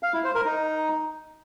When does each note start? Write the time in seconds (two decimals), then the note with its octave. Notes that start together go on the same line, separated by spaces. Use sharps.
0.03 F5
0.13 E4
0.24 C5
0.35 A#4
0.45 D#4